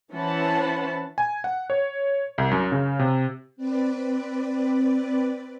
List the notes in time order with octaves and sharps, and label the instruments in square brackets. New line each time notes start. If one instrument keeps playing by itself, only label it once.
[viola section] E3 C#4 C5 F#5 A5 B5
[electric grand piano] G#5
F#5
C#5
C2
F#2
C#3
C3
[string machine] C4 B4 D5